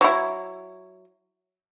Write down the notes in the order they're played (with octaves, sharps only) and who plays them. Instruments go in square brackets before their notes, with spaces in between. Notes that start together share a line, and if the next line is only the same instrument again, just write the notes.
[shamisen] F#3 E4